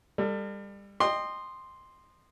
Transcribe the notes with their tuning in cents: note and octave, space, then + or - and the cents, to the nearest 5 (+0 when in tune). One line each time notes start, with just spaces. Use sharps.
G3 +30 A4 +30
D#5 -20 G5 +20 C6 +0